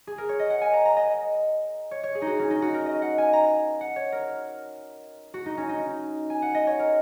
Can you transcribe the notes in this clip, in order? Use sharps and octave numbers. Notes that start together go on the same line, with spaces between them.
G#4
A#4
C#5
D#5
F#5
G#5
A#5
A#5
D#5
C#5
C#5
G#4
D#4
F#4
C#4
D#4
F#4
A#4
D#5
F#5
G#5
A#5
F#5
C#5
A#4
F#4
D#4
C#4
D#4
G#5
F#5
D#5
C#5
A#4